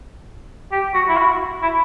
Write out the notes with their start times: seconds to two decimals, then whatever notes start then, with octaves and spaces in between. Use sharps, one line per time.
0.71 G4
0.94 F#4
1.09 E4
1.17 F#4
1.63 E4